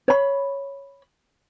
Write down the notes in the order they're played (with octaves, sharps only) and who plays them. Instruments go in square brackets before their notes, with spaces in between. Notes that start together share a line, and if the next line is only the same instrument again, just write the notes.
[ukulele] C#5 B5